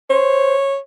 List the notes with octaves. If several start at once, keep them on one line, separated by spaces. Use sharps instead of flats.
C5 C#5